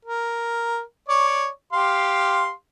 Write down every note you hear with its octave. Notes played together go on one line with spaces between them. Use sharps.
A#4
C#5 D5
G4 F5 C6